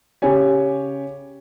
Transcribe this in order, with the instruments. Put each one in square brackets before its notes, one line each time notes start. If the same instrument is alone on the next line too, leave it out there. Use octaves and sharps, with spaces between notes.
[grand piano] C#3 G4 C#5 G#5